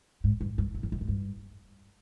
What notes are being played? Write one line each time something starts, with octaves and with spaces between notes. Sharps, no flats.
G#2
G2
G2
F#2
F2
F#2
G#2
G2